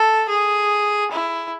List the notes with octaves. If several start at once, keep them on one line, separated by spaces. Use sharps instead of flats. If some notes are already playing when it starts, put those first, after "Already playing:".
Already playing: A4
G#4
E4